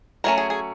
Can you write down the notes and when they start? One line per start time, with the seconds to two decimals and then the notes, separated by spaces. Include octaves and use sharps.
0.24 F#3 A3 C#4 A#4
0.38 G#4
0.50 G#4